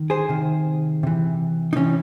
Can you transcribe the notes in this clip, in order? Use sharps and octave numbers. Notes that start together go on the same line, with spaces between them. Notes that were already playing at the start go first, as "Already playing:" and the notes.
Already playing: D#3
G#4 C5
C3 D#3
C3 E3
D#4
C3 E3 C#4